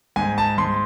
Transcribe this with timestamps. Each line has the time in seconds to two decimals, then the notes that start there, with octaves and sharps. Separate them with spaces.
0.16 G#2 G#5
0.38 A5
0.58 G#2 C6